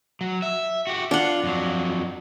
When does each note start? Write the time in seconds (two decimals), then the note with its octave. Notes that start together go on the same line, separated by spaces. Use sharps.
0.21 F#3
0.42 E5
0.87 F#4 G4
1.11 D4 F4 F#5
1.44 F2 F#3